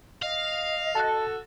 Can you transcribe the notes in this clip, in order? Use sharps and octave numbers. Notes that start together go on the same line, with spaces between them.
D#5 F5
F#4 A4 A5 F#6